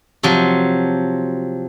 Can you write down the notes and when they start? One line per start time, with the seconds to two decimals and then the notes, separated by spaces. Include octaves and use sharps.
0.23 C3 F3 F#3